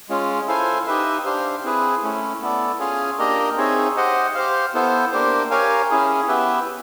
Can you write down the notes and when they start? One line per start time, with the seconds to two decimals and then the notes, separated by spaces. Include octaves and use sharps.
0.09 G#3 C#4 F4
0.48 E4 A4 C5 F5 G#5
0.87 D#4 G4 B4 E5
1.25 D4 G4 C5 F5
1.64 C4 E4 G#4 B4
2.03 A3 C#4 E4
2.41 B3 E4 A4 D5
2.80 C#4 F4 G#4 C#5 F5
3.18 A#3 D4 G4 A#4 D#5
3.57 C4 D#4 G#4 C#5 E5
3.96 G4 C5 D#5 F#5
4.35 G4 C5 F5
4.74 B3 E4 A4 C5
5.12 A#3 D4 G4 C5
5.51 G4 A#4 C#5 F5 G#5
5.91 C#4 E4 G#4
6.28 B3 E4 G4 B4 E5